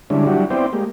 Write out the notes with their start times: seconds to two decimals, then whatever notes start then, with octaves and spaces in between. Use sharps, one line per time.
0.10 D3 G3 G#3 C#4 D4 E4
0.27 F#3 G3 D4 E4 F#4 G4
0.50 B3 C4 E4 C5 D5 G5
0.73 G#3 A#3 G4